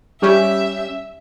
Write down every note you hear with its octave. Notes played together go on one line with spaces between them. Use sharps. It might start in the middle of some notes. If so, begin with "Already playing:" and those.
G3 C#4 G4 E5